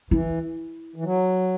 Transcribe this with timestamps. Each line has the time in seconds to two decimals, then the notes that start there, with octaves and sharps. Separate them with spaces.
0.11 E3 E4
0.96 E3
1.04 F#3